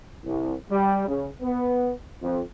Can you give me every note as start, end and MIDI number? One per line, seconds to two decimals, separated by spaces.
0.25 0.54 36
0.71 1.08 55
1.08 1.29 49
1.42 1.92 59
2.22 2.40 41